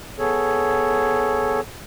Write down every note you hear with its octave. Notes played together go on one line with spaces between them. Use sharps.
B3 G#4 A4 C#5